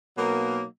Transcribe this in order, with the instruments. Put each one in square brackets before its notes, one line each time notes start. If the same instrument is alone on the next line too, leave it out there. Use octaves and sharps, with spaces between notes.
[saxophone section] B2 F#3 A#3 D#4